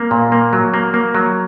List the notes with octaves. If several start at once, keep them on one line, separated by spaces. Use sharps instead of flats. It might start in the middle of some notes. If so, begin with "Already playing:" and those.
Already playing: A#3
A#2
A#3
F#3
A#3
A#3
F#3